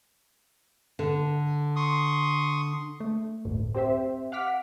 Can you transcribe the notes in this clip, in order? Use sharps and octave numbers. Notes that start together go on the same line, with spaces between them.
D3
C6 C#6 D#6
A3
G1 D2 A2
C4 G4 C5 E5
F5 F#5 D6 F6 B6